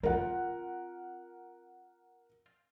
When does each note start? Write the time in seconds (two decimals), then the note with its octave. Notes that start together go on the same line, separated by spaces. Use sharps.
0.03 C4 F4 A#4 F#5